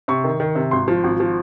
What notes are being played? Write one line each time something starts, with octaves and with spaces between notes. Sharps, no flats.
C3 C#6
D#3
D#3
C3
G#1 C6
F3
G#1
F3